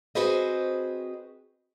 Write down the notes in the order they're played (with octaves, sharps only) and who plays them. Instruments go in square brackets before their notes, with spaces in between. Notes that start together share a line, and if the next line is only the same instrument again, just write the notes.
[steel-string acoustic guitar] C4 F#4 G#4 B4 C5 D#5